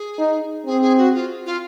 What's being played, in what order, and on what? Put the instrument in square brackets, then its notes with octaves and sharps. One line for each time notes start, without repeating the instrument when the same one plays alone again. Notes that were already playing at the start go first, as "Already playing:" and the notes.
Already playing: [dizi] G#4
[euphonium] D#4
[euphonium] C4 [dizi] G#4
[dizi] G#4
F#4
F4
F4